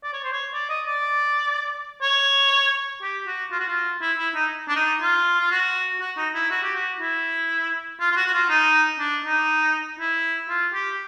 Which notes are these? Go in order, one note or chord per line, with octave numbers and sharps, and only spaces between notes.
D5
C#5
C5
C#5
D5
D#5
D5
C#5
G4
F#4
F4
F#4
F4
E4
E4
D#4
D4
D#4
F4
F4
F#4
F#4
D#4
E4
F#4
G4
F#4
E4
F4
F4
F#4
F#4
F4
D#4
D4
D#4
E4
F4
G4